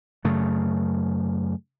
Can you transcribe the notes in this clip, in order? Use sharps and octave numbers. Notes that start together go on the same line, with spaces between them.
F#2 C#3 A3